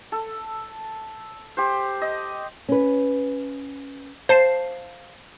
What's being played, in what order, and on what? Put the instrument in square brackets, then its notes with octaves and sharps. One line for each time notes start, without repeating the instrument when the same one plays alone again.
[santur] A4
G4 C5
D#5
[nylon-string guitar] C#4 B4
[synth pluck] C5 A5 C7 [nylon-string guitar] F5